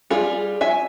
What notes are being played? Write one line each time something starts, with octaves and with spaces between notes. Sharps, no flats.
G3 F4 G#4
E5 G#5